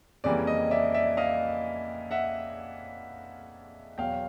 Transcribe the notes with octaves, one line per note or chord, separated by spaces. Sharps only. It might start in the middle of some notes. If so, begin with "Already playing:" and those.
F2 C#3 E3 G3 A#3 D5
D#5
D5 E5
D5 E5
D#5 F5
E5 F#5
E2 B2 F#3 F5 G5